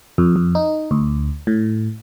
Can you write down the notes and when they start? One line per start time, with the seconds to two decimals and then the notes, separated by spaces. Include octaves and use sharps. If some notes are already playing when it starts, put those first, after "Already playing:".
0.18 F2
0.36 F2
0.55 D#4
0.91 D2
1.47 A2